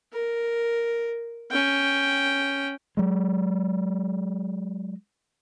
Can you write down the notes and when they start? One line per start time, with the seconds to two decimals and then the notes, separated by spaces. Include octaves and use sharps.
0.13 A#4
1.51 C#4 G5
2.97 F#3 G#3